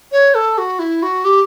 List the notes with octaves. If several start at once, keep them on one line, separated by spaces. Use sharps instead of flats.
C#5
A4
F#4
E4
F#4
G4